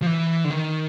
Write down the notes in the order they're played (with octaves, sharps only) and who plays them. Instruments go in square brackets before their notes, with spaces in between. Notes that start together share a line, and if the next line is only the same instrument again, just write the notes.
[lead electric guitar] F3
E3
D3
D#3